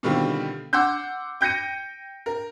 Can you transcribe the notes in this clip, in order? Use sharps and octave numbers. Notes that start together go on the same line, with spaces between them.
B2 D3 D#3 G3 C4 F4
F#5 C6 D6 E6 G6
G5 G6 A#6 C#7 D#7
A#4